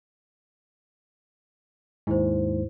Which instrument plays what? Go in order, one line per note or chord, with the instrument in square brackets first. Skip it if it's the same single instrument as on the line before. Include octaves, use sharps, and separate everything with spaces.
[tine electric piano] D#2 G#2 [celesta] E4 C5